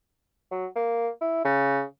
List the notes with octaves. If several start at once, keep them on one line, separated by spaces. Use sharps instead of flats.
F#3
A#3
E4
C#3